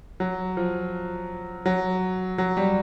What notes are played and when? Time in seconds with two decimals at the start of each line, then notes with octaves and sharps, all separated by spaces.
0.20 F#3
0.57 F3
1.66 F#3
2.38 F#3
2.57 G3